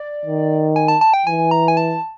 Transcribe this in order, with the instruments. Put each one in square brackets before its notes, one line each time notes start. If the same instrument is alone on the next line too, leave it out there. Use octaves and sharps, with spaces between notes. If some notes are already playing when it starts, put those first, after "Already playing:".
Already playing: [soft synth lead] D5
[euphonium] D#3
[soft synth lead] G#5
A5
A5
G5
[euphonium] E3 [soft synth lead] G#5
[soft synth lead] A#5
G#5
A5